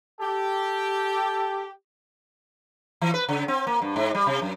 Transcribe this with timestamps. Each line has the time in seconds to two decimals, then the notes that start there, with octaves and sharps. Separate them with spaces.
0.20 G4 A4
3.01 E3
3.14 B4
3.29 C#3
3.48 C4
3.67 A#3
3.82 G2
3.96 G#2
4.15 G3
4.27 C3
4.42 F#2